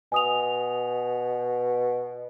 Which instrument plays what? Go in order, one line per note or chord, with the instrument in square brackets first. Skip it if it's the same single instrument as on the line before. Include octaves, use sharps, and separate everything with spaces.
[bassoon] B2 [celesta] G#5 D#6 F7